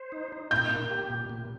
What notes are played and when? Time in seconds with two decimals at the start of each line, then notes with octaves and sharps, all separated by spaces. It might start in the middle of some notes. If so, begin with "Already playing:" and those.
Already playing: C5
0.12 D#4
0.32 D#4
0.51 A#2 G6
0.71 A#3
0.90 G4
1.10 A#2
1.29 A#2